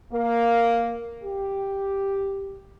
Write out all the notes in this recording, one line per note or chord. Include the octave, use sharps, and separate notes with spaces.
A#3
G4